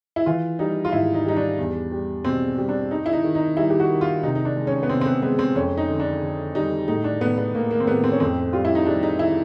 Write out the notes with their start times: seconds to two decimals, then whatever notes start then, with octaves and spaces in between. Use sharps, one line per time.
0.16 E4
0.26 E3 F4
0.59 G3 D#4
0.85 F4
0.92 G#2 E4
1.14 D#4
1.25 G3 D#4
1.36 D4
1.58 E2
1.92 G3
2.24 B2 C4
2.58 G3
2.69 D4
2.91 G2 D#4
3.06 E4
3.13 D#4
3.24 D#3
3.35 D#4
3.57 G3 E4
3.70 G4
3.80 F#4
3.90 D#3
4.01 F4
4.23 C3 D#4
4.35 D#4
4.45 D4
4.56 G#3
4.67 C#4
4.83 B3
4.89 C3 C4
5.01 C4
5.06 B3
5.22 G#3 B3
5.39 C4
5.55 F2 C#4
5.77 D#4
5.88 D3
6.00 D4
6.22 D3
6.55 G3 D#4
6.88 A2 D#4
7.04 D4
7.21 A2 B3
7.37 B3
7.54 A2 A#3
7.71 A#3
7.80 C4
7.87 A2 B3
8.04 C4
8.12 C#4
8.20 F2 C4
8.53 G3 F4
8.65 E4
8.75 D#4
8.86 G3 D4
9.03 D#4
9.19 E4